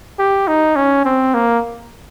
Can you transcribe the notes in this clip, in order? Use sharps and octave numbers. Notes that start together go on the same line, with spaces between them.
G4
D#4
C#4
C4
A#3